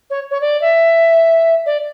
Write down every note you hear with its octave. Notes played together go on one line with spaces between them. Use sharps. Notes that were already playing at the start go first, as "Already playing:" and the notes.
C#5
C#5
D5
E5
D5